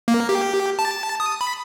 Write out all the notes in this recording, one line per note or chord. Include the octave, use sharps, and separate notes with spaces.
A#3
G4
A5
D#6
B5